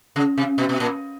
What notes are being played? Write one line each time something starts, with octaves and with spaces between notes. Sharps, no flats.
C#3
C3
B2
B2
A#2